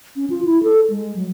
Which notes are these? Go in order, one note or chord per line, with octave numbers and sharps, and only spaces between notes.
C#4
F4
E4
A4
G#3
F#3